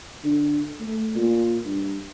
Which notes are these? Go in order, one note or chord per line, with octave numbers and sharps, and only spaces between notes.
D3
A3
A#2
G2